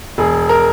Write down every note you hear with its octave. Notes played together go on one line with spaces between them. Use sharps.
E1 G#4
A#4